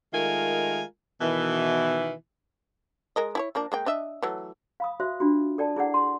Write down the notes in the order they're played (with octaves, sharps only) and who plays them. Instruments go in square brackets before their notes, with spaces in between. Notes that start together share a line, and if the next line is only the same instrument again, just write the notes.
[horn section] D#3 G#3 A3 F4 A#4 G#5
B2 D#3 E3
[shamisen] G#3 A#4 D#5
E4 G#4 C#5
F3 A#3 D4
G#3 A#3 G5
D4 D#5 E5
E3 F#3 A3
[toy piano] F5 B5 D#6
F#4 C5 E5
D4 F4 F#4
A4 D5 G5 A5
E4 G#4 D5 F#5
C6